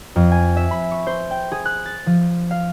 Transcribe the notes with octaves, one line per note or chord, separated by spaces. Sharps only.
F2
G#5
E5
B5
C#6
C5
G5
G#4
F#6
A6
F3
F5